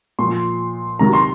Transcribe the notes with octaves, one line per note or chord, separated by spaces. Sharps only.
A#2 F3 C6
C3 D#3 F#3 A#5
C6